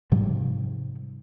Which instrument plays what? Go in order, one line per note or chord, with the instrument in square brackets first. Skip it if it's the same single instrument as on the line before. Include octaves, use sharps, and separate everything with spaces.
[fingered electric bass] G#2 C3 F3 G3